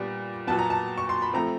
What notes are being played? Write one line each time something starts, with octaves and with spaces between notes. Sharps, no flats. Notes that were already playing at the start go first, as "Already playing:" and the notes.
Already playing: A#2 G3 B3 D4
A#2 F#3 B3 A5
A#5
A5
C#6
C6
B5
F3 A3 C4 A#5